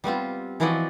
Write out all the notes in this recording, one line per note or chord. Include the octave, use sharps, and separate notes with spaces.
G3 B3 C4 F4
E3 F3 E4 F#4 D5 D#5